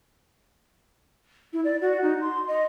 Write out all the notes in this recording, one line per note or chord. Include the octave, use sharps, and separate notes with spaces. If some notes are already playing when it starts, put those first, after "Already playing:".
E4
D5
F#4
D#4
C6
D#5